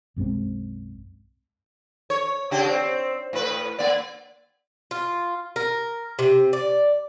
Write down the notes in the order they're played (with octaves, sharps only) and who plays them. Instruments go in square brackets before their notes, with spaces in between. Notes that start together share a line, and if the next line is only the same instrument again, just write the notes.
[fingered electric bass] B1 F#2 G#3 C4
[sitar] C#5
C#3 D4 G4
C4
A2 B4
A#3 D5
[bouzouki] F4
A#4
C3
D5